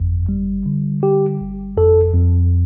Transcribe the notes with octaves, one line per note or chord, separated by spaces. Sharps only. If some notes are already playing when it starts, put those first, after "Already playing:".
Already playing: G1 F2
G3
D3
G3 G4
G1
F2 A4
F2